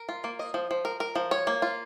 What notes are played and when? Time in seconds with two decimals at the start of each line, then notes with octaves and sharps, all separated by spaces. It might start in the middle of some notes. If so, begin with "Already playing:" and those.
Already playing: A#4
0.09 F4
0.24 A#3
0.39 D#5
0.54 F3
0.71 F3
0.85 A#4
1.00 A#4
1.16 F3
1.31 C#5
1.47 A#3
1.62 F4